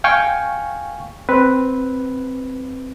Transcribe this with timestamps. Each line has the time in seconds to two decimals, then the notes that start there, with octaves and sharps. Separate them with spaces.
0.04 F5 G5 G#5 C#6
1.29 C4 B4